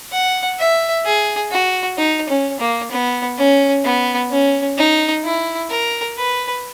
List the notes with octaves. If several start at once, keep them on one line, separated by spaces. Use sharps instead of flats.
F#5
E5
G#4
F#4
D#4
C#4
A#3
B3
C#4
B3
C#4
D#4
E4
A#4
B4